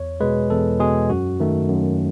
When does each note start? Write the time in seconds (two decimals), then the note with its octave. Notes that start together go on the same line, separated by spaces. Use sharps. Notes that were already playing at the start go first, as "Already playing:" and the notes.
Already playing: E2 C#5
0.20 B2 G#3 B4
0.50 E2 A4
0.80 B2 G#3 G#4
1.10 F#2 F#4
1.40 D#3 A3
1.69 F#2